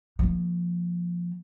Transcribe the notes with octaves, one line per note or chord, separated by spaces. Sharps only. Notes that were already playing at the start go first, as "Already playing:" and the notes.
F3 A#3